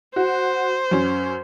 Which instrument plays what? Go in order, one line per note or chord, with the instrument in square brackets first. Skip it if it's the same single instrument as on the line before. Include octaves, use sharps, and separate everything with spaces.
[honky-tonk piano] F#4 [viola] C5
[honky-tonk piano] F#2 C#4